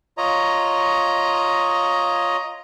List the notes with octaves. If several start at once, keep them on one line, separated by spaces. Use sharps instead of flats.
F4 C#5 D#5 A#5